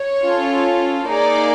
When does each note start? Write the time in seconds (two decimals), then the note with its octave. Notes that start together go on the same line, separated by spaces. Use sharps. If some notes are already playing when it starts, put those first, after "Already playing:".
Already playing: C#5
0.23 C#4 F4 A4
1.08 A#3 D#4 G#4 D5